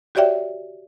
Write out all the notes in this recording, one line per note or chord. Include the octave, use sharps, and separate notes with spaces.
F#4 G4 C#5 D5 E5 G5